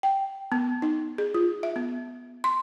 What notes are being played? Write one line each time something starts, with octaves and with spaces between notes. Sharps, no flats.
G5
B3
D#4
G#4
F4
E5
B3
C6